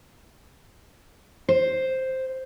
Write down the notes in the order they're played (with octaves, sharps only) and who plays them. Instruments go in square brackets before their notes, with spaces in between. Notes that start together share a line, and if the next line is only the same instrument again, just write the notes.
[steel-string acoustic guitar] C5